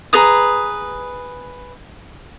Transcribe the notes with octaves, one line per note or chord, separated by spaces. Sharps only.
G#4 B4 A#5 D#6